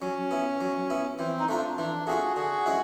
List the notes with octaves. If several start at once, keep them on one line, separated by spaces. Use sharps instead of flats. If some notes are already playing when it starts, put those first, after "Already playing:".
F#3 C#4
B3 E4
F#3
B3 E4
E3 C4
D#4
A3 C4 D4 F4
E3 D4
A3 C4 F4 F#4 G#4
D3 F#4 G#4
G#3 C#4 E4